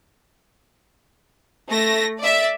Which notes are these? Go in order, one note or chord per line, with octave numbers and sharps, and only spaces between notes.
A3 A#6
D5 E5